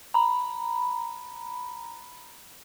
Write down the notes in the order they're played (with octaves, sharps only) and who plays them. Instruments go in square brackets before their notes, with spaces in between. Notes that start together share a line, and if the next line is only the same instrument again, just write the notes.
[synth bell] A#5 B5